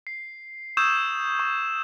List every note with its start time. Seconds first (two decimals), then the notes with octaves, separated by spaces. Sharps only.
0.07 C7
0.77 C#6 D#6 E6 G6 G#6 E7
1.39 C#6